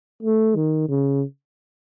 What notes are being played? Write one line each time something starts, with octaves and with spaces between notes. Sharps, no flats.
A3
D#3
C#3